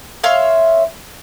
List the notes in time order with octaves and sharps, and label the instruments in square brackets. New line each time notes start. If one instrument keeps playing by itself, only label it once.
[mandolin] C#5 E5 F5 C6